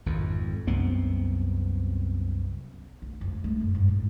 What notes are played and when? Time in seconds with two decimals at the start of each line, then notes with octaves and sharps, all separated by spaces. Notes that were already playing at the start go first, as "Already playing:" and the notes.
0.06 G#1 F2
0.67 C2 F#2 B3 C4
3.02 D2
3.21 F1
3.44 A3
3.61 F#2
3.75 G#2
3.88 G#2